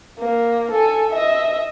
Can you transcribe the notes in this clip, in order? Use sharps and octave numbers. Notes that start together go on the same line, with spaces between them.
A#3
A4 G#5
D#5 E5